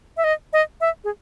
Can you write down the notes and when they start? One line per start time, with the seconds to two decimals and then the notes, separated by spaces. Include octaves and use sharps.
0.17 E5
0.24 D#5
0.53 D#5
0.81 E5
1.04 G#4